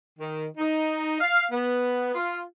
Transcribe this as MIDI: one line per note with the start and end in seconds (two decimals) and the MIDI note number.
0.19 0.46 51
0.58 1.17 63
1.21 1.44 77
1.52 2.13 59
2.15 2.41 65